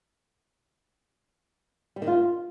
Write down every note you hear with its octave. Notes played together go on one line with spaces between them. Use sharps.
G3
D#3
F4